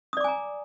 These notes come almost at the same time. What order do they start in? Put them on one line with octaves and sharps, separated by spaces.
D#6 D5 D6 G#5 A#5